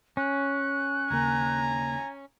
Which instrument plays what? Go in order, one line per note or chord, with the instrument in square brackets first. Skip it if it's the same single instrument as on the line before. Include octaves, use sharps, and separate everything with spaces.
[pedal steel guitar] C#4 [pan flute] F#6
[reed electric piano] D#2 C#3 A#3 [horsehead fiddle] G#5 A#5